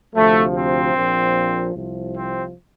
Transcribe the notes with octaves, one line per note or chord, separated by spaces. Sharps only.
D2 C3 F3 A3
C4
A#1 A#2 F3
C2 C3 F3
C4